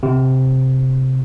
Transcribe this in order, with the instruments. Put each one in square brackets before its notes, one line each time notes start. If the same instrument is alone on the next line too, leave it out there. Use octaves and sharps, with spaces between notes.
[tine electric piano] C3